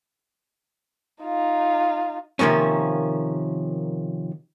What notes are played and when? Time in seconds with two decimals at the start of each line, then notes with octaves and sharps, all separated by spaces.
1.23 D#4 F4
2.39 C3 D#3 F3 A#3 C#4